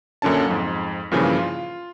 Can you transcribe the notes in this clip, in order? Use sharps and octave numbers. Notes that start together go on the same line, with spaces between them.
F#2 A#2 D3 C#4 A5
F2 G#2
G2 A#2 C#3 E3 F3
F4